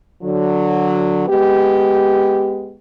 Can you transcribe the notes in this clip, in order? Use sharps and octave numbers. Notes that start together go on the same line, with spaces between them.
D3 F#3
G#3 B3 G4